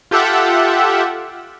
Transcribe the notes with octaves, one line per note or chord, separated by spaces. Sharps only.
F4 G4 A4 E5 F#5